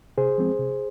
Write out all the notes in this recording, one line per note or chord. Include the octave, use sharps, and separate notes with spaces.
C3 G#4 C5
F3 G#3 C4
C3